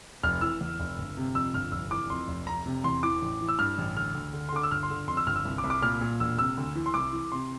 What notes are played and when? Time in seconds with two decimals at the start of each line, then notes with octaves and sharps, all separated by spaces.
0.23 F1 F6
0.41 E3 E6
0.61 E2
0.80 F1
0.98 G1
1.17 C3
1.35 F2 E6
1.54 G1 F6
1.72 F1 E6
1.91 E3 D6
2.10 F2 C6
2.28 F1
2.47 F1 A#5
2.66 C3
2.84 E2 C6
3.03 E3 D6
3.22 A1
3.41 E3
3.48 E6
3.59 G2 F6
3.78 A1
3.96 D2 F6
4.14 D2
4.33 D3
4.49 C6
4.52 D3 D6
4.63 E6
4.71 G1 F6
4.83 C6
4.90 D3
5.07 F2 C6
5.17 E6
5.27 G1 F6
5.36 E6
5.45 C2
5.58 D6
5.64 C2
5.70 D6
5.82 A#2 F6
6.01 A#2
6.20 E1 E6
6.39 C3 E6
6.57 D2
6.75 E3
6.86 C6
6.94 C2 D6
7.13 E3
7.32 C3 C6